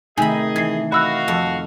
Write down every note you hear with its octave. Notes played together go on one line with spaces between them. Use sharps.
C3 D#3 A3 D#4 G#4 D#5 G#5 B5
E3 G#6 C7
F#4 D#5 F5 B5 E6 F#6
F2 A4